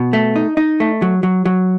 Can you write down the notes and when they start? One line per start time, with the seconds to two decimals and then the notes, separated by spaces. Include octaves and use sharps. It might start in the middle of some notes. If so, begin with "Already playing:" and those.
Already playing: B2
0.13 A3
0.36 D#4
0.57 D#4
0.80 A3
1.02 F#3
1.23 F#3
1.45 F#3